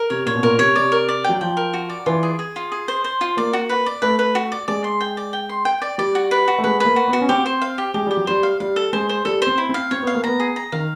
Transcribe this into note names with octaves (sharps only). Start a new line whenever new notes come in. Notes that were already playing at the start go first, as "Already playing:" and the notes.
Already playing: A#4
C3 C#5
A#2 C#5
B2
A#2 A#4
C3 C#5
C3 D5
A#4
D5
F#3 G5
F3 G5
A#4
F#4
D5
E3 F4
G#4
G#4
F4
G#4
C5
C5
F4
A#3 D5
F#4
B4
D5
A3 B4
B4
F#4
D5
G#3 D5
C6
G5
D5
G5
C6
G5
D5
G3 D5
F#4
B4
F#4
A3
G#3 B4
A#3 B4
F#4
B3
F#4
C#4
C4 G4
C5
F5
G4
G#3 G4
G3 G4
F#3
G3 C5
F5
G3 F5
A4
G#3 C5
C5
G3 A4
C5
C4
E4
C4
F5
C4 C#5
B3 F5
A#3
B3 A#5
G#4
A#5
D#3 F5